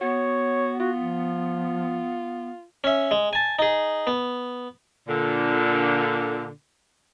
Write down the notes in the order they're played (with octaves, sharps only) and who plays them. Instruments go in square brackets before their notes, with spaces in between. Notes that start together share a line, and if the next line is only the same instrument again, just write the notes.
[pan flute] B3 [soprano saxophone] F#4 [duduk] C#5
[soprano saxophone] F4 [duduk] F#4
[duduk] F3
[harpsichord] C#4 E5
G#3
G#5 A5
D#4 G#4
B3
[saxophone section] A#2 D3